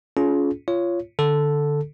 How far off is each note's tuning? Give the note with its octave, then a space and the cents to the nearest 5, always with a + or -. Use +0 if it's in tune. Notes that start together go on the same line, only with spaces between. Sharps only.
C#4 +30 F4 +0 G#4 +35
F4 -20 C#5 +0
D3 +5 A4 +0